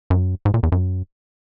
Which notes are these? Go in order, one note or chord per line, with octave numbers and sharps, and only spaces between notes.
F#2
G#2
A#2
E2
F#2